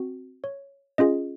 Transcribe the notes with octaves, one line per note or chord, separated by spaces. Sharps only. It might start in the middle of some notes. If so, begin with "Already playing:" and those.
Already playing: C4 F#4
C#5
C#4 F4 G#4 D#5